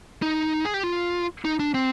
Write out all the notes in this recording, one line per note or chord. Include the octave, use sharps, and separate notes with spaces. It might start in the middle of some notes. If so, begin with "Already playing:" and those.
D#4
G#4
G4
F4
D#4
D4
C4